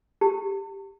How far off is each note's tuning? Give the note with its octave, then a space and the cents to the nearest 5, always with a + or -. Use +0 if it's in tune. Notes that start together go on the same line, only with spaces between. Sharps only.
G4 -10 A5 +45